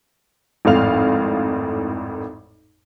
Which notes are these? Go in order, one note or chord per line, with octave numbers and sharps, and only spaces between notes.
G#1 F2 A2 F5 F7